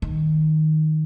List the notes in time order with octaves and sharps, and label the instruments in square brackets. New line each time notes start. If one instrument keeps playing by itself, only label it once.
[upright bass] D#3